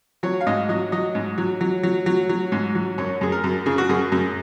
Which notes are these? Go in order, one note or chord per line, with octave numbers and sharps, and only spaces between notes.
F#3 C#5
F5
G#2 D#5
F#3 D#5
F#3 D#5
G#2
F#3
F#3
F#3
F#3
F#3
G#2
F#3
F#2 C#5
F#2 G#4
A#4
F#2
C#3 G#4
F#4
F#2 G#4
F#2